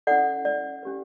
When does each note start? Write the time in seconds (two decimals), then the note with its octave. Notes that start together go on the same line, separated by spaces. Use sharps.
0.07 C#4 E4 A4 D5 F#5
0.45 D5
0.83 C#4 G4 B4